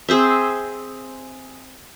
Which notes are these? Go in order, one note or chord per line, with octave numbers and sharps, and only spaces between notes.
C4 G#4 C5 E5